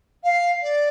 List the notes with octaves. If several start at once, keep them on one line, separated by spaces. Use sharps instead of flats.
F5
D5